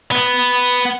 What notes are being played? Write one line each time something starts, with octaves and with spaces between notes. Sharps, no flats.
B3